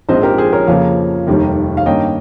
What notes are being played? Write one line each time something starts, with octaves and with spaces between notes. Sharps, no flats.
A#1 G#2 F3 C4 C5 D#5
G4 A#4
G#4 C5
A#4 C#5
F2 C#3 F3 A#3 C#5 F5
F1 D#2 D#3 G3 A#3
F5
G2 D#3 A#3 C#4 D#5 G5